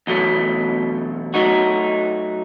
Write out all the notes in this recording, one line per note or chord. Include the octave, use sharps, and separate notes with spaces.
E2 B2 F#3 A3
F#3 A3 D#4 F#4